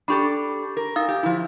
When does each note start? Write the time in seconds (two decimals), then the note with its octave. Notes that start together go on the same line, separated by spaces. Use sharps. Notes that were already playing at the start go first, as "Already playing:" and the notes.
0.08 D4 G4 A4 B5 C#6
0.77 A#4
0.96 D#4 F5 D#6
1.08 G4
1.23 F3 E4